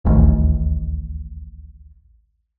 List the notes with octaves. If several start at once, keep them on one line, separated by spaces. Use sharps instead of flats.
D1 A1 D#2